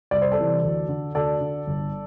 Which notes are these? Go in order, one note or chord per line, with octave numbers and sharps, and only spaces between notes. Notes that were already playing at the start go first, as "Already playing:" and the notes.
C2 D5
C5
A4 D5
C3 E3
D2
D3
D2 A4 D5
D3
G1